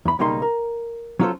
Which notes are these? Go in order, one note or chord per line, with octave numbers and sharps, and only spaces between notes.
E2 B5
B1 C#3 G3 A#3 D#4 C6
A#4
F#3 C#4 F4 F#4 A4 C5